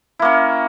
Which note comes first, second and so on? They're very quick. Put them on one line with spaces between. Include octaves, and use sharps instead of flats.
E4 A#3 C#4